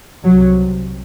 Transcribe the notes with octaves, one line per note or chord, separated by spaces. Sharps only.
C2 C3 F#3